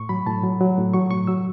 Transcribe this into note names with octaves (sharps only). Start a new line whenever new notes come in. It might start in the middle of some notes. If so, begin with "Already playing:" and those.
Already playing: A2 C#6
F#3 B5
A2 A5
F#3
F#3
A2
F#3 C#6
A2 C#6
F#3 E6